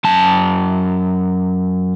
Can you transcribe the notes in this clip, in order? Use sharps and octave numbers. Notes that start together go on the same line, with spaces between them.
F#2 A5